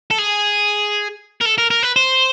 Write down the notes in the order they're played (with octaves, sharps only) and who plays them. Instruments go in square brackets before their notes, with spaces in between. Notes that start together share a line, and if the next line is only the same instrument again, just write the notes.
[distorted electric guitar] A4
G#4
A#4
A4
A#4
A#4
B4
C5